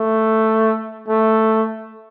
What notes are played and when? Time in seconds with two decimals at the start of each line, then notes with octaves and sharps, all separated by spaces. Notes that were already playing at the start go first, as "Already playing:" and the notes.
Already playing: A3
1.09 A3